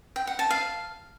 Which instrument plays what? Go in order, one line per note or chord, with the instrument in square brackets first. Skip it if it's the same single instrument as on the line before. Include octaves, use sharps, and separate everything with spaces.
[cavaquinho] G5
F#5
A5
F5